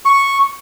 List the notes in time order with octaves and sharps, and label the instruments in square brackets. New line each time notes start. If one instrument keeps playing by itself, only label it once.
[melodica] C#6